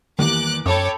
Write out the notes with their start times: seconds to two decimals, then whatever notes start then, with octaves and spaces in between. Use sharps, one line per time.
0.19 E2 D#3 G3 A#3 D6 F#6
0.66 F#2 A4 C#5 G5 B5 D6